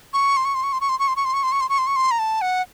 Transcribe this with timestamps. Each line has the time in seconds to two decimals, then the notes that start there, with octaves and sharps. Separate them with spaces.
0.13 C#6
0.37 C6
0.45 C#6
0.55 C6
0.63 C#6
0.73 C6
0.81 C#6
0.89 C6
0.99 C#6
1.08 C6
1.16 C#6
1.25 C6
1.34 C#6
1.43 C6
1.52 C#6
1.61 C6
1.69 C#6
1.78 C6
1.87 C#6
1.96 C6
2.11 A#5
2.19 A5
2.41 F#5